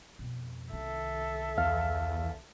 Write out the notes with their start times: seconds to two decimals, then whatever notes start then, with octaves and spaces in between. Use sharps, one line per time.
0.19 F2 B2
0.73 C2 D#3 A4 E5
1.58 E2 F5 F6